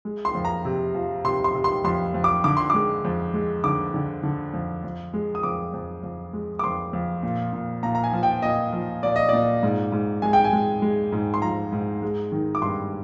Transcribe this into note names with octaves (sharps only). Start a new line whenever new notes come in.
G#3
C6
F2
A#5
C3
F3
C3 C6
C6
C3
C6
F2 C6
F2
D6
D3 D6
C6
G#3 D6
F2
G#3
D3 D6
D3
D3
F2
F2
G#3
D#6
F2 D6
F2
F2
G#3
D6
F2 C6
F2
A#2
A#2
A#2 A#5
A#5
G#5
F3
G5
A#2 D#5
F3
A#2 D5
D#5
A#2 D5
G#2
G#2
G#3 G#5
G5
G#5
G#3
G#3
G#2
C6
F3 A#5
G#2
G#3
D#3
D6
G2 C6